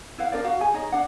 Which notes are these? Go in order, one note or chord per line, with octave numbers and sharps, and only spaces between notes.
E4 B4 F5 F#5
D4 A#4 C5 D5
F#4 F5 F#5
G4 G#4 G#5
D#4 G#4 C#5 D#5
D4 F#5